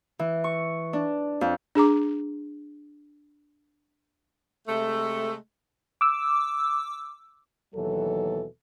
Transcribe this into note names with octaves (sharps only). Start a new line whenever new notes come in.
E3
C#6
D4
F2
D4 G#4 A#5 D6
C3 G#3 A3
D6 E6
D#2 B2 E3 F#3 A4